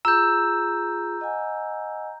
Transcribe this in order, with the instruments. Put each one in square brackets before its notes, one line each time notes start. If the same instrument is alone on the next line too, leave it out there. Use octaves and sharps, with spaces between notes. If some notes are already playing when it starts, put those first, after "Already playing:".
[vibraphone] F4 G#4 [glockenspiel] A#5 G6 [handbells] E6
[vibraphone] D#5 F#5 G#5